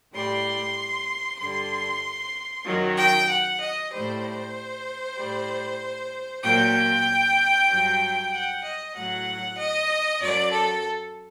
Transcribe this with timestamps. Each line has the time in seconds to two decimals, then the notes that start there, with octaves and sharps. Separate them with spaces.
0.13 A2 G3 C6
1.39 G2 D3 G3 C6
2.65 F#2 D#3 F#3
2.97 G5
3.29 F#5
3.60 D#5
3.91 A2 G3 C5
5.17 A2 G3
6.43 A#2 F#3 G5
7.68 G2 F#3
8.32 F#5
8.63 D#5
8.94 A2 F#3 F#5
9.57 D#5
10.20 F#2 F#3 D5
10.52 A4